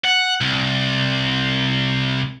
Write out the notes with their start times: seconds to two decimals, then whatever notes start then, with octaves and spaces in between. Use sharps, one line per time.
0.04 F#5
0.41 C2